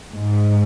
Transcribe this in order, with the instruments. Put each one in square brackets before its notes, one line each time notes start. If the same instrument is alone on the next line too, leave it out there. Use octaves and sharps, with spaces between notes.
[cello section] G#2